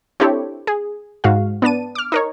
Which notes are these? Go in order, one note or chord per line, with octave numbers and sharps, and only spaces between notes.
C4 D4 E4 G4 A4 C#5
G#4
G#2 F#4 F5
B3 D4 A5 D#7
D6 F6
D#4 A#4 C#5